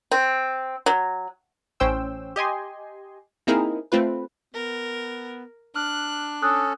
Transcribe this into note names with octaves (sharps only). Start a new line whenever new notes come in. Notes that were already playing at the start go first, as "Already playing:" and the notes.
C4
F#3
A1 C#4 C5 G5 E6
G4 D#5 G#5 C6
A#3 C4 D#4 E4 G#4 A#4
A3 C4 F4 B4
B3 A#4
D4 F6 F#6
C#4 A4 D#6 F#6